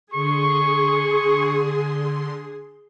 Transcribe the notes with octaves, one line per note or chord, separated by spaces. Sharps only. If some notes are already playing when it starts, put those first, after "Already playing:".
D3 G#4 C6 C#6